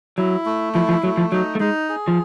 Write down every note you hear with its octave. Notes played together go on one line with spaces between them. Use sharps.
F#3 E4
A3
F3 E4
F3
F#3 A3
F3
F#3 D#4
A3
G#3 D#4
G#4
F3